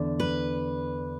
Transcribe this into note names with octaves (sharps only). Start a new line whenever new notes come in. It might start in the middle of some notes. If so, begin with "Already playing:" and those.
Already playing: E2 D3 D4
B4